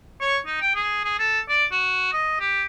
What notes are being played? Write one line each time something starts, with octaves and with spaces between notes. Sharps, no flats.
C#5
D#4
G5
G#4
G#4
A4
D5
F#4
D#5
G4